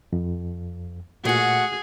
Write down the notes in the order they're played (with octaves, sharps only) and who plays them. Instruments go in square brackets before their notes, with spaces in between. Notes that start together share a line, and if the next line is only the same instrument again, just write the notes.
[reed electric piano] F2
[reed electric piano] A#2 [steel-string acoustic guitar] A3 F#4 [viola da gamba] G#4 [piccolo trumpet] F#5